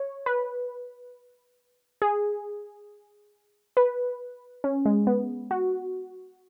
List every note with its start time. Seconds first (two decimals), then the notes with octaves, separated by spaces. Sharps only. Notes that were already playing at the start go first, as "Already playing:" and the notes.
Already playing: C#5
0.26 B4
2.02 G#4
3.77 B4
4.64 C#4
4.85 G#3
5.07 B3
5.51 F#4